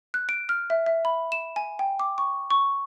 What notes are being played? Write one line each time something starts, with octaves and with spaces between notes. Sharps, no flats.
F#6
D7
F6
E5
E5
B5
E7
G#5
G5
D6
C#6
C#6